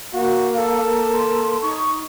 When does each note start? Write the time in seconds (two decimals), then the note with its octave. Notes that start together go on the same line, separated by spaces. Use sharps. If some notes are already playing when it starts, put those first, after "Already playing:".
0.13 A#3 F#4 F5
0.57 A4
1.14 C6
1.61 D#4 C#6